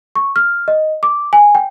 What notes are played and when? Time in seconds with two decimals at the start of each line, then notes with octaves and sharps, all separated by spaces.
0.15 C#6
0.36 F6
0.68 D#5
1.03 D6
1.33 G#5
1.55 G5